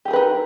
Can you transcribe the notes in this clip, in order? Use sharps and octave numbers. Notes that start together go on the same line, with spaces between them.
D#4 G4 G#4 A#4 B4